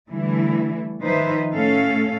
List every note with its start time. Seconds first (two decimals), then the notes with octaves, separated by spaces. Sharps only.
0.12 D3 E3 G3 A3 E4
1.01 D#3 F3 D#4 B4 C5 E5
1.53 A2 A3 C#4 A4 F5